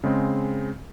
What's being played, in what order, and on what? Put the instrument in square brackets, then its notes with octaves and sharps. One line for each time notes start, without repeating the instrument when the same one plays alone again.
[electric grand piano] C#3 G#3 C4